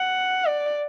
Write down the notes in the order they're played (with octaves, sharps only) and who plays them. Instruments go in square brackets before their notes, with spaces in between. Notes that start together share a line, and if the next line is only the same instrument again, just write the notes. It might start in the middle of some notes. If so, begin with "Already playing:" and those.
Already playing: [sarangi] F#5
D5